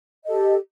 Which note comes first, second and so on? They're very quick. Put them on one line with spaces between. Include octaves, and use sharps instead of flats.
D#5 A4 G4